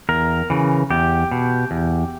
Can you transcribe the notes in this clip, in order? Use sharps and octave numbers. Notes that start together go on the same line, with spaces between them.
E2 A#4
C#3 E3
E2 G4
B2
E2